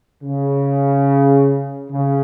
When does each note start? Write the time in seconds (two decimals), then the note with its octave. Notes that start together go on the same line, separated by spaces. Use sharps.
0.23 C#3
1.91 C#3